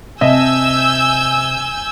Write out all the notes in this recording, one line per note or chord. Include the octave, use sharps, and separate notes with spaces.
C3 D#5 E5 G#5 A5 E6 G6